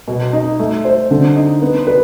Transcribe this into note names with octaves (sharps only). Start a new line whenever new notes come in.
B2
D#4
A3
C5
D3
D#4
B3
B4